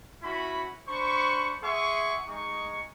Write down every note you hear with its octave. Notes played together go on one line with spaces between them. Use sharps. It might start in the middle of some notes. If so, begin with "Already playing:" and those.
C#4 E4 F#4 B5
D4 C5 B5 C#6
G#4 E5 F#5 C6 C#6
G#3 D#4 C#6